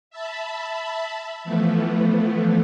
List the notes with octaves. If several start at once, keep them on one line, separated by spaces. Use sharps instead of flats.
E5 A5 B5
E3 F3 A3 B3